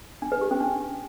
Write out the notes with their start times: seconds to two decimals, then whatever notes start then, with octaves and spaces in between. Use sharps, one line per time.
0.22 D4
0.32 B4
0.41 G4
0.51 C#4
0.61 D4